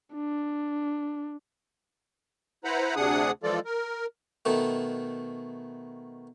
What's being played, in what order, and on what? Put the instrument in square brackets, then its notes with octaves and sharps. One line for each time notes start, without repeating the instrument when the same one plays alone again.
[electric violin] D4
[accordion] E4 B4 C5 F#5 A#5 B5
D2 C3 D4 G#4 F#5 D#6
E3 F3 G#3 F4 A4 D5
A#4
[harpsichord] B2 D#3 A3